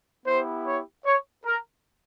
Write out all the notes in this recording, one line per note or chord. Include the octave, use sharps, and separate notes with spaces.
B3 E4 G4 C5
C#5
C#5
A#4